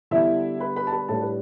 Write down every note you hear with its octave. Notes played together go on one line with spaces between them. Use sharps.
D3 G3 B3 D4 E4 E5
B4 B5
B4 B5
A5
B4 B5
A2 G3 D4 A4 A5
B4